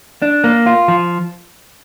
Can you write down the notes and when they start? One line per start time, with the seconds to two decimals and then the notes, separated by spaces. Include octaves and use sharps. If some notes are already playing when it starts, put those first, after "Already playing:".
0.22 D4
0.44 A#3
0.66 F4
0.88 F3